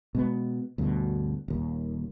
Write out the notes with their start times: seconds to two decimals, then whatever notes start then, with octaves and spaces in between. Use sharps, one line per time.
0.15 B2 G#3 B3
0.78 D2 G2 B2
1.48 D#1 D#2